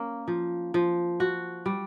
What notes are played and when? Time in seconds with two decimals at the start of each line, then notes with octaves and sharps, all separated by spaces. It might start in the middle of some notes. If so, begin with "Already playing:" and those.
Already playing: A#3 C#4
0.28 F3
0.74 F3
1.20 F#4
1.66 G3